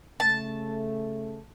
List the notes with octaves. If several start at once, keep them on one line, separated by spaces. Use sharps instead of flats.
C#3 A3 A5